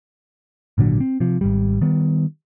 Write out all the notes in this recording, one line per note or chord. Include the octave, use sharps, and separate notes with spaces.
G#1 A#2 D3 F#3
C4
C3 F3
G#1 G3
D#3 G3 B3